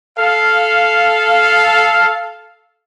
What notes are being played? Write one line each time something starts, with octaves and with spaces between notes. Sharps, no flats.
A4 F5